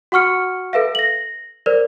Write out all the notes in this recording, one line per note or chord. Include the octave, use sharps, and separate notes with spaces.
F#4 F#5 C#6 F6 C#7
A4 B4 E5 F5
A#6 F#7
A#4 C5 D5